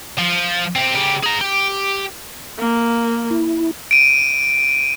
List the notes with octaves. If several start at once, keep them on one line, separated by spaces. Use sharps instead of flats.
F3
C4 G4
C#3 G4
G#4 A#5
G4
A#3
E4
D7 D#7